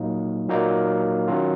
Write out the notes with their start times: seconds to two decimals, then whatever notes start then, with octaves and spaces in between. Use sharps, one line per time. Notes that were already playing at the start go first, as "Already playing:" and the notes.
Already playing: A#2 F#3 A#3 D#4
0.48 A#2 F#3 A#3 D#4
1.28 D#3 F#3 C#4 F4